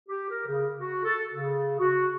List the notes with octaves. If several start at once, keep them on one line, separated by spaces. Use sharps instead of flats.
G4
A#4
C#3
F#4
A4
C#3
F#4